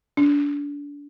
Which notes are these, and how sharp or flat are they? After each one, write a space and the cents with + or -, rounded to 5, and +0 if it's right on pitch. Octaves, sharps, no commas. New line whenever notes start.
D4 -30